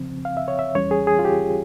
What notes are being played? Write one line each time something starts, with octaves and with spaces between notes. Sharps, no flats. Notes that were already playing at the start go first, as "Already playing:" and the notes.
Already playing: F2 C#3 F3 C4
F5
E5
C#5
E5
E2 E3 G3 C#4 C#5
G#4
G#4
F4
G4